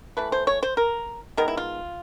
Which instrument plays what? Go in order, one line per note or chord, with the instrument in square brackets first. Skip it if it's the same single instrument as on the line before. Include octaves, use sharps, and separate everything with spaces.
[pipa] E3 A3 B4
C5
C#5
C5
A#4
D#3 G#3 B3 A#4
E4
F4